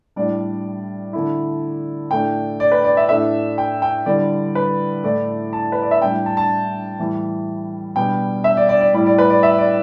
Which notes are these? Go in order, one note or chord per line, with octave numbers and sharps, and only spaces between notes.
A2 G3 D4 D5
D3 A3 E4
A2 A3 D4 G5
D5
B4
D5
E5
A2 A3 D4 E5
G5
G5
D3 G3 E4 D5
B4
A2 A3 E4 D5
A5
B4
D5
E5
A2 G3 D4 G5
A5
A5
A2 E3 G3
B2 G3 B3 D4 G5
E5
D5
D5
D5
A2 G3 E4 D5
D5
B4
D5
E5
D5